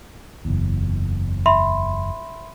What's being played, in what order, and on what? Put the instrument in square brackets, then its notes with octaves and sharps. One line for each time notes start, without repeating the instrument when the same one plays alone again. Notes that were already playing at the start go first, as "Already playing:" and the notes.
[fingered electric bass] F#1 E2
[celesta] E5 B5 C6